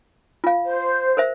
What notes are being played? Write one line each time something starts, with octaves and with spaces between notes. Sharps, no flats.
F4 F5
C5
A#4 C5 E5